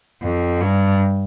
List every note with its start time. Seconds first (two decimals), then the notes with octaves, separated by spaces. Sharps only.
0.21 F2
0.61 G2